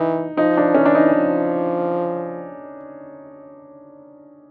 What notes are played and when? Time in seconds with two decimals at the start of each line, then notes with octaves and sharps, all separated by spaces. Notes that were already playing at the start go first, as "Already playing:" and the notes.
Already playing: E3 D#4
0.37 F3 D#4
0.57 D4
0.74 E3 C#4
0.85 D4
0.95 D#4
1.15 F3